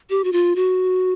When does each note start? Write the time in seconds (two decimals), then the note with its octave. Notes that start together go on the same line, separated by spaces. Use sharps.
0.10 G4
0.24 F#4
0.33 F4
0.56 F#4